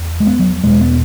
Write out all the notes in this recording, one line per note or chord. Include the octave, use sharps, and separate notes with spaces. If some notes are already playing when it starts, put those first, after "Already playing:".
Already playing: E2
G#3
B3
F#3
E2 B2 G#3
B3